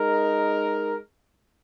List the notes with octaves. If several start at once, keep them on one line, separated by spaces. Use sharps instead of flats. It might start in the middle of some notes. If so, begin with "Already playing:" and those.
Already playing: G#3 D#4 A#4